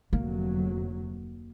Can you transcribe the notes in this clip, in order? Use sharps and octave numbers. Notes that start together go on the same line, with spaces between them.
F1 D2 F#3 A#3